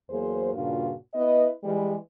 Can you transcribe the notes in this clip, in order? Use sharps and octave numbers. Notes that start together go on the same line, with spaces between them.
E2 F#3 A#3 G#4 C5
G2 A#2 C#3 D4 F4 F#4
B3 E4 B4 D#5
E3 G3 G#3